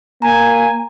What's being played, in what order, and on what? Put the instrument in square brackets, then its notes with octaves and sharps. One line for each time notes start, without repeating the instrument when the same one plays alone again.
[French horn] A#3 [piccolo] G#5 [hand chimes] A#5